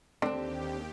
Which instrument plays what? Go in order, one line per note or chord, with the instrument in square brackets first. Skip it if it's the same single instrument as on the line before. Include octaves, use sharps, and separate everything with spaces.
[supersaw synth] D#2 G4 [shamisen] D3 [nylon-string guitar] C4 D4